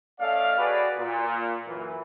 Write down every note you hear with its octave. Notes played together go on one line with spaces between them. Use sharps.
A3 C#4 A4 D5 D#5 F5
F#4 G#4 B4 D5
A#2
F#2 E3